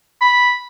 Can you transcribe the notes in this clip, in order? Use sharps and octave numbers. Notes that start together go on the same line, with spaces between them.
B5